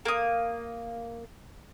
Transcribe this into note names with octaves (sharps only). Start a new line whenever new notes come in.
A#3 D#6